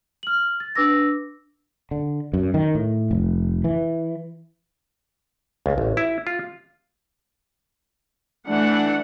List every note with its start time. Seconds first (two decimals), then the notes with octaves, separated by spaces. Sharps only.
0.23 F6 F#7
0.60 A6
0.75 D4 B4 D6 E6 A#6
1.91 D3
2.33 F#2
2.54 D#3
2.75 A2
3.11 F1
3.64 E3
5.66 C#2
5.78 A1
5.97 E4
6.27 F4
8.48 E3 A3 D4 F#5